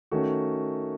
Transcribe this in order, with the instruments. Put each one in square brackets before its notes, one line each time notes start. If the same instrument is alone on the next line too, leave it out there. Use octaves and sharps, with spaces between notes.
[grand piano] D#3 A3 C#4 F#4